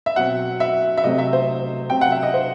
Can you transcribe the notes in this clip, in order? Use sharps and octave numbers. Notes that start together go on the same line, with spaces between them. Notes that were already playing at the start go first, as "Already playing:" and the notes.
E5
B2 F#3 C4 F#5
E5
E5
C3 F#3 A3 C4 D#5
E5
C5
C3 F#3 C4 G5
F#5
E5
D#5
C5